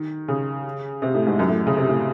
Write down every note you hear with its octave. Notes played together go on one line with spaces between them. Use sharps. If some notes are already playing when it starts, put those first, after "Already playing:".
Already playing: D#3
C#3
C3
A2
G#2
F#2
A2
C#3
C3
A2